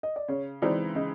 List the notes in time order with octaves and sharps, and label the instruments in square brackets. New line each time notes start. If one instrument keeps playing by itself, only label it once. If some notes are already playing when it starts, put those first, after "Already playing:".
[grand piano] D#5
D5
[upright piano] C#3 [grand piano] C#5
[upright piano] E3 G#3 C4 D#4 [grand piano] D5
[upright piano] C#3 [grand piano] D#5